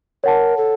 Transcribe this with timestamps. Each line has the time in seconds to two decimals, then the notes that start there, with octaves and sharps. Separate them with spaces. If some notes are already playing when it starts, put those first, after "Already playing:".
0.24 A#4 C#5 F#5 A5
0.57 A4